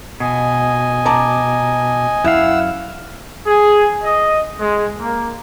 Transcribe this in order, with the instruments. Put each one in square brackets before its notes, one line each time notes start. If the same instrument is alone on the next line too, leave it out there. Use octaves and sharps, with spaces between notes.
[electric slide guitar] B2 [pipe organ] D#5 G#5
[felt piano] A5 A#5 D6
[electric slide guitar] F#2 F5 [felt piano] E4 [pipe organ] F#5 E6
[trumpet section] G#4
D#5
G#3
A#3